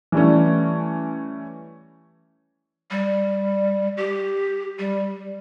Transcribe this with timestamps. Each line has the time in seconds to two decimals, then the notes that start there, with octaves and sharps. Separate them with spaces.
0.12 E3 G3 A3 C#4
2.91 G3
3.97 G4
4.79 G3